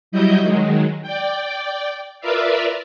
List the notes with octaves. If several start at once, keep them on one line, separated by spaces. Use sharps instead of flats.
F#3 G3 E4 D#5 G6
D#3 F#3 G#3
D5 G5
F4 A#4 B4 D5 E5 F5